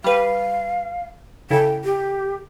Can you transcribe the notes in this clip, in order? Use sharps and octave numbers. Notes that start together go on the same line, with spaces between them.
G3 B4 F5
C#3 E4 A4 G5
G4